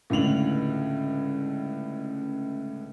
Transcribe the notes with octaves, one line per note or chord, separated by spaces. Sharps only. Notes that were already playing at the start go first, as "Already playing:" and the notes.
C#2 A2 D3 F7 F#7